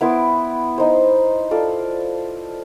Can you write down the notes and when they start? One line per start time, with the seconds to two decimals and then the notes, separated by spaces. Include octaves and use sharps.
0.01 B3 E4 C6 D6
0.78 D#4 C5
1.51 F4 A4 D5